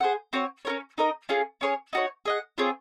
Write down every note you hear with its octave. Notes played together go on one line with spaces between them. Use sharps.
G#4 C5 F#5
C4 F#4 C#5
C#4 F4 A#4 C#5
D#4 A#4 D#5
C#4 F4 G#4
C#4 G#4 C#5
D#4 F#4 C#5
G#4 D#5 F#5
C4 F4 G#4 C#5